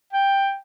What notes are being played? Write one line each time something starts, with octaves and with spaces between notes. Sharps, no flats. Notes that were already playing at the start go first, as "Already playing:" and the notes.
G5